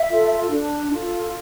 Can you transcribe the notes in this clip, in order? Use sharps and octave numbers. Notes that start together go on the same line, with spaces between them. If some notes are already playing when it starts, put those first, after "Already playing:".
Already playing: E5
F4 A4
D4
F4 A4